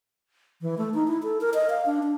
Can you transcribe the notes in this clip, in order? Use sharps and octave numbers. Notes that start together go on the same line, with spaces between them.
E3
A3
D#4
E4
A4
A#4
D#5
F5
D4
D4